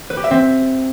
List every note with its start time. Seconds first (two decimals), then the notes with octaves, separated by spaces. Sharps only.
0.10 B4
0.17 G4
0.24 E5
0.31 C4